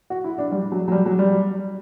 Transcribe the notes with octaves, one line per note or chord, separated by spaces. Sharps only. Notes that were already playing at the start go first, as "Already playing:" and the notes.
F#4
E4
D4
G3
F#3
F#3
G3
F#3
G3